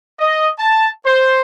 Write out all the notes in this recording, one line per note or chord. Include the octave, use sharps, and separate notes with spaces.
D#5
A5
C5